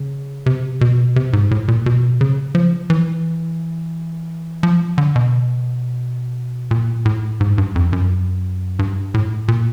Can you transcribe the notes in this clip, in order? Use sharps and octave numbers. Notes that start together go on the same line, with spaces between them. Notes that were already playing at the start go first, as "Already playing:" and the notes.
Already playing: C#3
C3
B2
C3
G#2
A2
A#2
B2
C#3
F3
E3
F3
D3
B2
A#2
A2
G#2
G2
F2
F#2
G2
A2
A#2